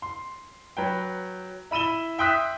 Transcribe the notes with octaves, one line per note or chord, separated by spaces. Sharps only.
C6
F#3 B4 G5
E4 B5 D#7 E7 G7
E5 G5 C6 D#6 F#6 B6